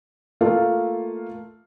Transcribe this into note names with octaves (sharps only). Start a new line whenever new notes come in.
A3 A#3 F4 A4 F5